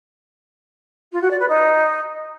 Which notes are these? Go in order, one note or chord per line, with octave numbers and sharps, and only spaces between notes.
F4
F#4
D5
B4
D#4